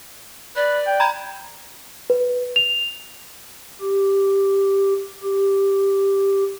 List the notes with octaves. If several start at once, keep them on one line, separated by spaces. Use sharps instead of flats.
B4 D5
G5
A#5 B5 G#6
B4
F7
G4
G4